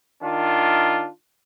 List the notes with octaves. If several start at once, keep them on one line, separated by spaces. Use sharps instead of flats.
D#3 D4 F4